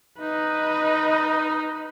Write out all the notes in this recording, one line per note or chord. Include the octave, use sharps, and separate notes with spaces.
D#4 B4 D#5